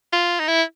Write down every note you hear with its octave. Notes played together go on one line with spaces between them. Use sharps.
F4
D#4
E4